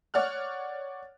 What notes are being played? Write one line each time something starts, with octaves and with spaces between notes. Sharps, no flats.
C#5 D5 F#5 F6 F#6